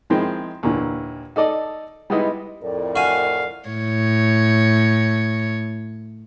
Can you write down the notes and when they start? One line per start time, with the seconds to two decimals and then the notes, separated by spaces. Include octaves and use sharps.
0.10 D#3 F3 G#3 C4 E4
0.63 D#2 A#2 D3 E3
1.36 D#4 A4 D5 D#5
2.10 G3 G#3 B3 D#4 E4 D#5
2.63 F2 A2 A#4 D5
2.96 F#4 F5 G#5
3.69 A2 C#5